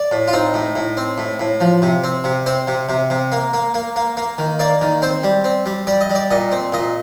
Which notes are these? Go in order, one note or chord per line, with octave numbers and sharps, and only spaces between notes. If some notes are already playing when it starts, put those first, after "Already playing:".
Already playing: D5
A2
F4
C4 D#4
A2
A2
C4
A2
A2
F3
C3
C4
C3
C4 C5
C3
C3
C3
A#3
A#3
A#3
A#3
A#3
D#3
A#3 D5
D#3
C4 C5
G3
C4
G3
G3 D5
D#5
G3
D5
A#2 D#5
C4
A#2 D#5